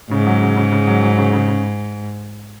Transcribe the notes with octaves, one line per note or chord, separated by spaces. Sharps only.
G#2 C#3
F#3
C#3
C#3
C#3
F#3
F#3
C#3
C#3
C#3